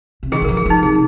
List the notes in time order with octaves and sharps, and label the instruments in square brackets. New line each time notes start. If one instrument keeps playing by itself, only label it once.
[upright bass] C3
[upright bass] D#3 [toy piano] G#4
[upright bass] D#3
[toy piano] A#4
[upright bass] F3
[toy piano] G#4
[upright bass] F3 [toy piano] D#4
[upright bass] C3 [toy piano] G#4